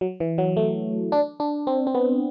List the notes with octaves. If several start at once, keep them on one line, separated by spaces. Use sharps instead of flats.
F#3
E3
F#3
A3
D4
D4
C4
C4
B3